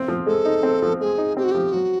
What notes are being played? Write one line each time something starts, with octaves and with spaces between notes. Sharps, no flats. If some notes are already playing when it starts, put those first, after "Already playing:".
Already playing: C4
F3
G#3 A4
D#4
C4
F3
G#3 G#4
D#4
C4 G4
F#4
F3 G4
F#3 F#4